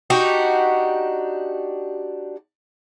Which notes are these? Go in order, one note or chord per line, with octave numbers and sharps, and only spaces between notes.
D4 D#4 F#4 G4